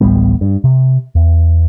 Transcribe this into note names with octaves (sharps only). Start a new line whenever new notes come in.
D1 A1 G3 B3
G2
C3
E2